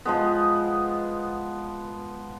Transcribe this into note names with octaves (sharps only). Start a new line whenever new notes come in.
F3 G#3 B3